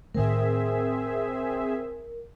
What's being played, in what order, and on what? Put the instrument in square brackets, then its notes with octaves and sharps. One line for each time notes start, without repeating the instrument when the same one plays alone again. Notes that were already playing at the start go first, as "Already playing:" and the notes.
[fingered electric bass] A2 D#3 A3 [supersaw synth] C4 G#4 E5 [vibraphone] A#4